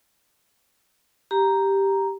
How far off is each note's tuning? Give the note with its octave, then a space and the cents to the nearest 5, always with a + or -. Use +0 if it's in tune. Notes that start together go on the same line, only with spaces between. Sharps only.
G4 +0 A#5 +0